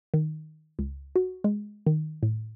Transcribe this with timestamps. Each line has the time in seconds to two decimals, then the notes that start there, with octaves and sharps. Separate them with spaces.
0.14 D#3
0.79 C#2
1.16 F#4
1.44 G#3
1.87 D#3
2.23 A2